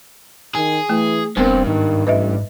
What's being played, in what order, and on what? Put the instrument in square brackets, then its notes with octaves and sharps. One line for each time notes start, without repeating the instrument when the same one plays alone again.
[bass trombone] D#3 [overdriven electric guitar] G#4
[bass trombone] E3 [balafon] A3
[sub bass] E1 [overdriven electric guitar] G2 [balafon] B3 A#4 [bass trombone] C4
[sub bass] G#2 [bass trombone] D#3
[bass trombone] A1 [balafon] B4 D#5 E5